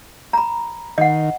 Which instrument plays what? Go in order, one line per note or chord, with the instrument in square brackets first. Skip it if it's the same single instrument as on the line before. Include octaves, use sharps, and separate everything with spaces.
[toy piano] A#5 B5
[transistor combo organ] D#3 [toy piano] D#5 F#5